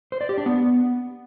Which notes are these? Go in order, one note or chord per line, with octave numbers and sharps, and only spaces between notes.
C5
D5
G4
D4
B3